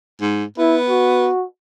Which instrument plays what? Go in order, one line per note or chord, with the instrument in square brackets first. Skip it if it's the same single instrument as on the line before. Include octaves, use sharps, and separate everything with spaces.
[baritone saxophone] G#2
[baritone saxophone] B3 [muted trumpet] E4
[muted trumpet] F#4